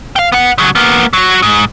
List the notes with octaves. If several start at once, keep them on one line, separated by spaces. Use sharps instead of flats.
F5 G5
B3 F#5
C#3 F#3
A#3 B3
F#3 F#4
G#2